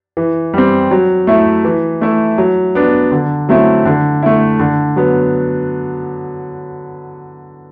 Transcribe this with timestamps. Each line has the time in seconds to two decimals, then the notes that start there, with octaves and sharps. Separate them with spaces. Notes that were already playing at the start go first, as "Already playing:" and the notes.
0.17 E3
0.54 G3 C4
0.91 F#3
1.27 A3 E4
1.65 E3
2.01 A3 E4
2.38 F#3
2.75 B3 D4
3.12 D3
3.49 F#3 A3 C4 E4
3.86 D3
4.23 A3 E4
4.60 D3
4.96 F#3 B3